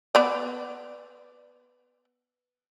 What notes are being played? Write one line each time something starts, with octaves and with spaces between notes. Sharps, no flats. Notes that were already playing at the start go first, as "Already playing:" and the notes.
B3 D5